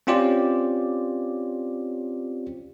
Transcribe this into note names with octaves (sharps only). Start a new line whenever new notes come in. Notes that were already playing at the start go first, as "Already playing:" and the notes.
C4 C#4 F4 G4 C5 D5